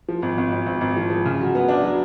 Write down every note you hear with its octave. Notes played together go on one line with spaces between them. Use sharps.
F3
G#1
G#1
G#1
G#1
G#1
F3
F3
C#3
F#3
B3
D4
F#3